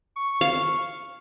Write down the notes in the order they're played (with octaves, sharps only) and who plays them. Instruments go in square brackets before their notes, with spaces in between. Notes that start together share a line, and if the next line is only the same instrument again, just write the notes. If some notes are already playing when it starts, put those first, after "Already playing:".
[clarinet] C#6
[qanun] F5